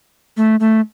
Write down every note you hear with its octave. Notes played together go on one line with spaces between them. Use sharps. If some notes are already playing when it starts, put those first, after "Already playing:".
A3
A3